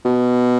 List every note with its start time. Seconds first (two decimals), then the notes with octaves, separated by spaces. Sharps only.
0.06 B2